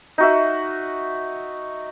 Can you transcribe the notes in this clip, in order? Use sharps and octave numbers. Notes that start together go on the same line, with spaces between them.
D#4 F#4 E5